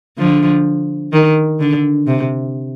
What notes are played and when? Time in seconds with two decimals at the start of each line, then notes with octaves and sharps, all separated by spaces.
0.18 D3 F3
1.13 D#3
1.60 D3
2.07 C3